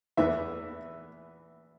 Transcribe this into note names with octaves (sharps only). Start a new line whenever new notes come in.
E2 E3 B3 E5